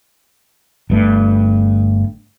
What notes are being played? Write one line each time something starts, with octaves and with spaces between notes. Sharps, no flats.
G1 G2 A3